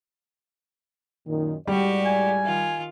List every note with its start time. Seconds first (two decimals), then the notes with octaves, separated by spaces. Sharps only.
1.27 F#2 A#2 D#3
1.67 A2 G3 G#3 F#4 G4 D5
2.06 G#5
2.45 D#3 F4